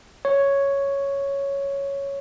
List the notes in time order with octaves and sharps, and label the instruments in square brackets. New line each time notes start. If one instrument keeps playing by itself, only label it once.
[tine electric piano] C#5